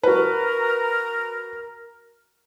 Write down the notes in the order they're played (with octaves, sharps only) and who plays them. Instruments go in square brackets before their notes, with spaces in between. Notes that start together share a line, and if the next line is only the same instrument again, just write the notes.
[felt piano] F#4 B4 [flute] A#4